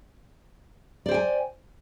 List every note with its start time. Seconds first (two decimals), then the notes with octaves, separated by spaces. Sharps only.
1.06 D5
1.09 C5
1.11 G5
1.14 G#5